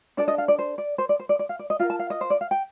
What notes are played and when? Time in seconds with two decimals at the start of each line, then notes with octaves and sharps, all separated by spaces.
0.17 D4 A4 D5
0.28 D#5
0.38 F5
0.48 D5
0.59 C5
0.78 D5
0.98 C5
1.09 D5
1.19 C5
1.29 D5
1.39 D5
1.49 F5
1.59 D5
1.70 D#5
1.79 F4 A#4 F5
1.90 A5
1.99 F5
2.10 D#5
2.21 C5
2.30 D5
2.41 F5
2.51 G5